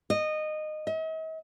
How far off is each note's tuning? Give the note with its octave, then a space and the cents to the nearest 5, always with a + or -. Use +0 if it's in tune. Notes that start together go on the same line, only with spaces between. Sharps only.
D#5 -20
D#5 +45